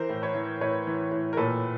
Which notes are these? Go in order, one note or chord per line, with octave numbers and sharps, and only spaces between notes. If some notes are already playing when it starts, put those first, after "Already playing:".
Already playing: E3 A#4 C5
A2
B4 C#5
E3
A2 B4 C#5
E3
A2
A#4
A#2 A4 B4